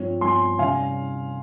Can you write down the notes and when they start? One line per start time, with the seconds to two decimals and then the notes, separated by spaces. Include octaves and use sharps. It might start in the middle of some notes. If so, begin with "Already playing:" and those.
Already playing: G2 F3 C4 C#5
0.21 G2 F3 C4 G#5 C6
0.59 C3 G3 C#4 F5 G#5